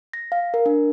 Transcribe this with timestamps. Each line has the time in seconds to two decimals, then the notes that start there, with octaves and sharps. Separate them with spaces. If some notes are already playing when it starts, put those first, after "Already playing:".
0.13 A#6
0.32 F5
0.54 A#4
0.66 D4